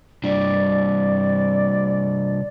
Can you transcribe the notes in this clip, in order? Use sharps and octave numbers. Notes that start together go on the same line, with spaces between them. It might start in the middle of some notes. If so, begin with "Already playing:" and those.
C3 G3 D4 D5